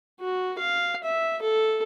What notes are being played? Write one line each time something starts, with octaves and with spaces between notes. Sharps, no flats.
F#4
F5
E5
A4